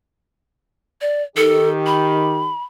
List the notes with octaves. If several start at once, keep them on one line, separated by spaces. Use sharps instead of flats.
D5
D#3 G4 A4
B5